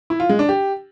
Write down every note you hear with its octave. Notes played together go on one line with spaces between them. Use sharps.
E4
F4
G#3
D4
G4